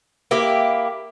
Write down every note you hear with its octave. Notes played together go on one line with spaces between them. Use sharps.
A#3 E4 G4